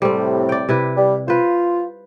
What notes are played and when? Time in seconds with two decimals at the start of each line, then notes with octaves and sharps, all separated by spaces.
0.02 A2 C3 G3 C4
0.49 D5 G5
0.69 C3 E4 B4
0.97 G3
1.28 F4 B4 C5